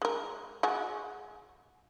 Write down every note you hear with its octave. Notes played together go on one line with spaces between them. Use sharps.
G#3 A#4
G#3 F#4